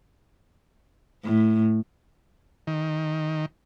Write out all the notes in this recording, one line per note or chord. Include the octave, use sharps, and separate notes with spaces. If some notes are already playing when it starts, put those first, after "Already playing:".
A2
D#3